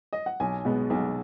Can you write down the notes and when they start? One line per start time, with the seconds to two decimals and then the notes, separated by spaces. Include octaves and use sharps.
0.13 D#5
0.26 F#5
0.40 B1 G#5
0.65 B2 G#3 B3
0.90 B1